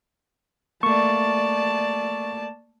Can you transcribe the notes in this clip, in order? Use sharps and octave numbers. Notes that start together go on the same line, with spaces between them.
A3 A#3 D5 A5 C#6